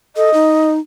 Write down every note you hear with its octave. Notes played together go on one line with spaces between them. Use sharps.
A4 D#5
D#4